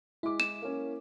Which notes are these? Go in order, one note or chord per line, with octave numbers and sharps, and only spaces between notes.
G#3 E4 D6
E7
A#3 C#4